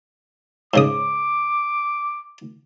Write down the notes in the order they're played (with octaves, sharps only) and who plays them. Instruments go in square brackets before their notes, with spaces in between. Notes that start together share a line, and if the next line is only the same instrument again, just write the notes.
[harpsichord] G#2 C#3 D#6 [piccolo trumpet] D6